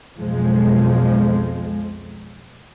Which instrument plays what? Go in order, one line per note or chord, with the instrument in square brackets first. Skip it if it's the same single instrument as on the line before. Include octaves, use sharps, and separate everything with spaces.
[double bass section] B1 F2 F3 G#3